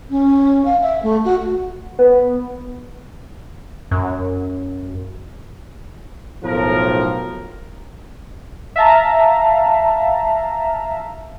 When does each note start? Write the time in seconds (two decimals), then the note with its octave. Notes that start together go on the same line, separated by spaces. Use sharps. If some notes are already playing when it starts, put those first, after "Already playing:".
0.10 C#4
0.65 F5
0.82 E5
1.03 A3
1.25 F#4
1.99 B3
3.91 F#2
6.44 B1 A2 F3 A#4
8.76 E5 F5 A5 A#5